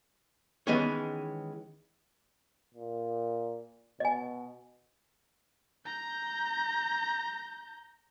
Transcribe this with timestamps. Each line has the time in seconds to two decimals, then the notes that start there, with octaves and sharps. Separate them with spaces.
0.67 D#3 E3 G#3 B3 C#4 C#5
2.74 A#2
4.00 B2 D#5 G#5
5.85 A#5 G6